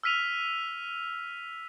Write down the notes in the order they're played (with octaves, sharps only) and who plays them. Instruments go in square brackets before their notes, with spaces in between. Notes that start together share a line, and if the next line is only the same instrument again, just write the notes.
[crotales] E6 F6 B6 D#7 F7